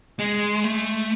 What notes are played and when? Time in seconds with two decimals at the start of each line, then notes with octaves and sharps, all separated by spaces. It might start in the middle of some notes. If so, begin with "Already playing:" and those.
0.19 G#3
0.64 A3